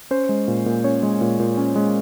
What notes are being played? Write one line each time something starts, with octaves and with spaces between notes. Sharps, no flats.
C#4 C5
G#3
A#2
A#2
C#4 C#5
G#3
A#2
A#2
C#4
G#3